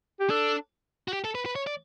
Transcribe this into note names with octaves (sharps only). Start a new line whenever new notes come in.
G4
D4 A4
F#4
G4
A4
B4
B4
C#5
D5